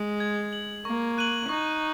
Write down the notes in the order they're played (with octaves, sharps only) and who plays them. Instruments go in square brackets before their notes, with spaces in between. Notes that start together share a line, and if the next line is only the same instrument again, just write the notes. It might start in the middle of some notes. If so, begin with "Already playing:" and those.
Already playing: [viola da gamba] G#3
[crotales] G#6
F#7
[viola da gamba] A#3 [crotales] C#6
[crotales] F#6 D#7 F#7
[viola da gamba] D#4 [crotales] C#6